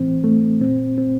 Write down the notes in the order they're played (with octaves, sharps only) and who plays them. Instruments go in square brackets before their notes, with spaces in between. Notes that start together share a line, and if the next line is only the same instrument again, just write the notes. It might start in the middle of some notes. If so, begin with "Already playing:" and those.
Already playing: [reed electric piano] A2 E3 C4
A3
A#2 C4
C4